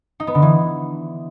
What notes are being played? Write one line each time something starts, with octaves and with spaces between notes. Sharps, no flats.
D#4
B3
D3
E3